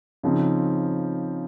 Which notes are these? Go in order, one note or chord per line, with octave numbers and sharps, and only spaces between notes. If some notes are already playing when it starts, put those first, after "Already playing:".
C#3 F3 C4 D#4